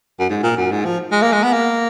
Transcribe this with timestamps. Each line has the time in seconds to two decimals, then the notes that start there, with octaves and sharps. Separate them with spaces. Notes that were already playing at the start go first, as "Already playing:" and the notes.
0.19 F#2
0.30 G#2
0.43 A#2
0.57 F#2
0.71 G#2
0.85 F3
1.12 G#3
1.22 A#3
1.32 G#3
1.43 B3
1.53 A#3